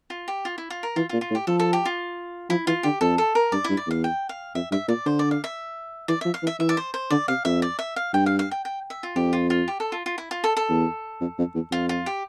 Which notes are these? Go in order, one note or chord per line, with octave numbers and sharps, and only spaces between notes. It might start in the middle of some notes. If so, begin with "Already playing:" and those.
F4
G4
F4
E4
F4
A#4
E3 F4
F4
A#2
F4
A2
G4
F3 A4
A4
G4
F4
F3 E4
E3 F4
D3 G4
F2 A4
A4
A#4
G2 D5
E4
G2
D5
E2 F5
G5
F5
F2 E5
G2 E5
A#2 D5
D3 C5
D5
F5
E5
E3 D5
F3 E5
F5
E3
E5
E3 E5
D5
C5
C5
D3 D5
C3 F5
F2 E5
D5
E5
F5
G2 G5
F5
F5
G5
G5
E5
F4
F2 G4
F4
F4
G4
A4
F4
F4
E4
F4
A4
A4
E2
F2
F2
E2
F2 F4
F4
G4